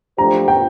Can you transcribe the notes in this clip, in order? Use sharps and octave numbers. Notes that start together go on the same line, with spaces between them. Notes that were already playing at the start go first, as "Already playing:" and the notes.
F3 A3 D4 G4 C5 A#5
G5